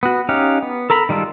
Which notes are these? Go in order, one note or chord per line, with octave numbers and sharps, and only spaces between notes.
B3 F#4
C#4 D#4 G4 F5 F#5
B3
A4 A#4 A#5 B5
D#3 G3 G#3 F4 A4